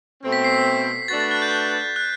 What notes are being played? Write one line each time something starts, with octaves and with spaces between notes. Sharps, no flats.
B2 A3 C4
B6
C7
B6
A3 D4 F#4 B4 A6
A6
F#6
G6
F#6